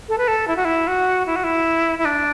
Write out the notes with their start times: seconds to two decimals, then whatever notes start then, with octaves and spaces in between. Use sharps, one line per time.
0.09 A4
0.18 B4
0.28 A4
0.48 E4
0.56 F#4
0.65 E4
0.87 F#4
1.27 E4
1.36 F#4
1.44 E4
1.98 E4
2.05 D4